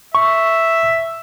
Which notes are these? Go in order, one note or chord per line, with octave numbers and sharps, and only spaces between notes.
E5 C#6